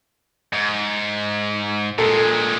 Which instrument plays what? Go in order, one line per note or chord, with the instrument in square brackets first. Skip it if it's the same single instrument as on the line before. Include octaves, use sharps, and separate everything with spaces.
[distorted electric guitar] G#2
[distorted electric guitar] A#2 G#3 [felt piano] A4